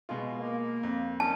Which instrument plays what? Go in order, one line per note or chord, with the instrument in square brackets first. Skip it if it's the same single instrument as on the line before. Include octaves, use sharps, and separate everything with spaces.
[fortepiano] B2 G#3 F4
[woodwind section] A#3
[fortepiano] F2
[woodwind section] D#3 F#3 C#4 [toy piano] A5